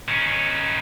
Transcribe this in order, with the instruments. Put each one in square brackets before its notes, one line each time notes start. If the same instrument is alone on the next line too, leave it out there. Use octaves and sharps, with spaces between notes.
[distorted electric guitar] D#3 C#4